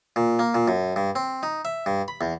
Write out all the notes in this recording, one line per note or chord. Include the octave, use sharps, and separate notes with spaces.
A#2
A#3
A#2
F#2
G2
C4
D#4
E5
G2
B5
E2